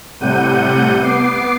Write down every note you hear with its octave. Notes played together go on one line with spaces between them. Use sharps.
A2 C3 G3 F#5 G6 D#7
B3 D6 C7